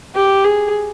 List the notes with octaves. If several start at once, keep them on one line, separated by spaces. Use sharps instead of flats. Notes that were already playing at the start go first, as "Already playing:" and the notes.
G4
G#4